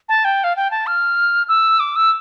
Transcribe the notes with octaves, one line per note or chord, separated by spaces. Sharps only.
A5
G5
F5
G5
A5
F6
E6
D6
E6